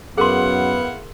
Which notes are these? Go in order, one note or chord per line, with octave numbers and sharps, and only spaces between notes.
F#2 B3 E4 G#4 A#4 F5 F#5 C6